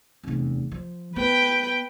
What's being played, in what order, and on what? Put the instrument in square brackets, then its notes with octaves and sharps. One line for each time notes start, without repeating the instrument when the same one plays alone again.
[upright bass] F1 E2
F3
[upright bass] B3 [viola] B4 G5